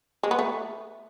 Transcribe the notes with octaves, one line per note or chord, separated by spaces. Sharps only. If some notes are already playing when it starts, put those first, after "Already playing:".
G#3
B3
A3